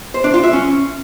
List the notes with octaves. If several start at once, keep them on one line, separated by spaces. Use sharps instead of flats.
C5
D4
F4
E5
C#4